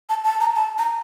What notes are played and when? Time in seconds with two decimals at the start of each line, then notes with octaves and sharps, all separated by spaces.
0.09 A5
0.24 A5
0.40 A#5
0.55 A5
0.78 A#5